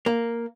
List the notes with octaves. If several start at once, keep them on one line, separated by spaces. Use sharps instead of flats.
A#3